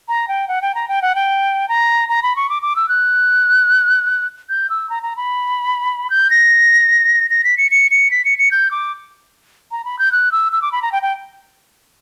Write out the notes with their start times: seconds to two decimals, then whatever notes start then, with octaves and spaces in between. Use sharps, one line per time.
0.08 A#5
0.28 G5
0.48 F#5
0.62 G5
0.75 A#5
0.88 G5
1.02 F#5
1.15 G5
1.69 A#5
2.09 A#5
2.23 B5
2.36 C#6
2.50 D6
2.62 D6
2.76 E6
2.89 F#6
4.49 G6
4.70 E6
4.90 A#5
5.03 A#5
5.17 B5
6.10 G6
6.31 A#6
7.30 A#6
7.44 B6
7.58 C#7
7.71 C#7
7.91 C#7
8.11 B6
8.25 C#7
8.38 C#7
8.51 G6
8.71 D6
9.71 A#5
9.85 B5
9.99 G6
10.12 F#6
10.32 E6
10.52 E6
10.62 D6
10.72 B5
10.82 A#5
10.92 G5
11.02 G5